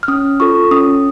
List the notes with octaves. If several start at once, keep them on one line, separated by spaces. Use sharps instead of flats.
F6
C#4 D#6
F4 A4 C#6
C#4 D#6